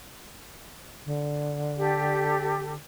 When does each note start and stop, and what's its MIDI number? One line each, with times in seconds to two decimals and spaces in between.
1.06 2.77 50
1.77 2.72 67
1.77 2.72 69